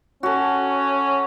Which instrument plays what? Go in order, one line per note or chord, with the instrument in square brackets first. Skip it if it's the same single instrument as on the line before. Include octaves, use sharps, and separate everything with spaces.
[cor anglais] C#4 [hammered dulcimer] F#4 A4